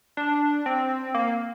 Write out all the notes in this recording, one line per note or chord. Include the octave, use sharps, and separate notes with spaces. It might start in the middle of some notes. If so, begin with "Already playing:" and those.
D4
C4
A#3